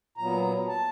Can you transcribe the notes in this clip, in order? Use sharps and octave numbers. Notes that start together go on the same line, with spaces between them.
A#2 F#3 B3 A#5
A5